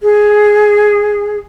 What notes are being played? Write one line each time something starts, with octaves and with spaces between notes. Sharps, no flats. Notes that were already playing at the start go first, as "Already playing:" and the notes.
G#4